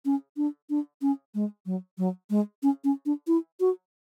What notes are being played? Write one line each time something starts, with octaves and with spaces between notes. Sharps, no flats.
C#4
D4
D4
C#4
G#3
F#3
F#3
G#3
C#4
C#4
D4
E4
F#4